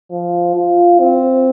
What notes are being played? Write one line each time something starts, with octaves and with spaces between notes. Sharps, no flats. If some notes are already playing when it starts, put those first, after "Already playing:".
F3
F4
C4